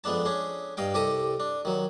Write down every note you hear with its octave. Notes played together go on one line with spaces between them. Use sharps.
F2 G#3 B3 D4 A5
C#4 D4 G#4
G2 D#5 F5 G5
C2 G4 A4 D#5 A5 D#6
D4
D#3 F#3